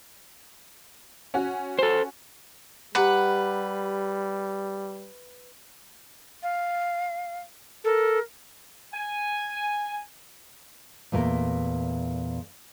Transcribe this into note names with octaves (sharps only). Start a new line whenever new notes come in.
C#4 F#4
A4 C5
G3 G4 B4 F#5 A#5 D6
F5
A4 A#4
G#5
E2 A#2 A3 A#4